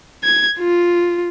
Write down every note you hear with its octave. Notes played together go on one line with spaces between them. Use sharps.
G#6
F4